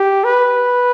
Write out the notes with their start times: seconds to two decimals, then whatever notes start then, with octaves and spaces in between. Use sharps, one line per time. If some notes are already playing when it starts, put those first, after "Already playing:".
Already playing: G4
0.24 B4